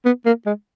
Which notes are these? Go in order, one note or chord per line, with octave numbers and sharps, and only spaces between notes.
B3
A#3
G#3